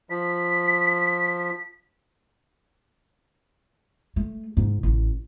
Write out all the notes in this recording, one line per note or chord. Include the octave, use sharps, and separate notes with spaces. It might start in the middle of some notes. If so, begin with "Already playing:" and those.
F3 B6
A3
G#2
A1